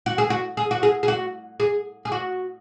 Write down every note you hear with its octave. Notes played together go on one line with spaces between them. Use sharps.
F#4
G#4
F#4
G#4
F#4
G#4
G#4
F#4
G#4
G#4
F#4